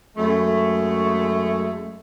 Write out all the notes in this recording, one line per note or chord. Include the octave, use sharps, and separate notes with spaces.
F#2 G#3 A3